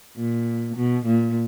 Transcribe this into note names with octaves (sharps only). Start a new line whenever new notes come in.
A#2
B2
A#2